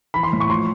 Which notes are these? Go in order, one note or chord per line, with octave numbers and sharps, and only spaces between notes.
E3 B5
C6
A2
C#6
F3 C6